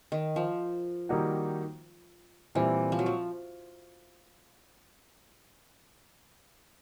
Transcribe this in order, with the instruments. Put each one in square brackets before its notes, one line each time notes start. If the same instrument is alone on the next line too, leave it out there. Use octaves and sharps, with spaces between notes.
[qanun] D#3
F3
[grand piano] D#3 G3 A#3 D#4 F#4
[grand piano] A#2 G3 C4 [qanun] E3
[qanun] F3
F#3
F3